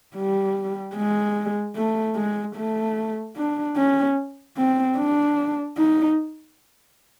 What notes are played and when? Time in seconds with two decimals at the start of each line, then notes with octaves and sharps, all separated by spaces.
0.16 G3
0.95 G#3
1.76 A3
2.16 G#3
2.56 A3
3.36 D4
3.77 C#4
4.57 C4
4.97 D4
5.78 D#4